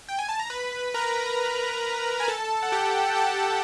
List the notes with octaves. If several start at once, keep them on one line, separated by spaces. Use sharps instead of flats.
G5
G#5
A5
A#5
B4 B5
A#4 A#5
G#5
A4 A5
F#5
G4 G5
A4 A5